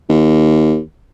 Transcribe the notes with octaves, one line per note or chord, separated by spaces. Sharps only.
D#2